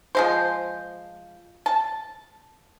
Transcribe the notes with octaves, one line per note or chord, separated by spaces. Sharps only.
F3 G#3 C5
A5